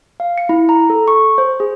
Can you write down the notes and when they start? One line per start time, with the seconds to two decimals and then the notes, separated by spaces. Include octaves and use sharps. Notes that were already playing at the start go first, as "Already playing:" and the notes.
0.20 F5
0.38 C#7
0.49 E4
0.69 A#5
0.90 A4
1.08 C#6
1.38 C5
1.60 G#4